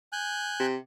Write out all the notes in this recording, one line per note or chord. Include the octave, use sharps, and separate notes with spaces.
G#5 F#6 G6
C3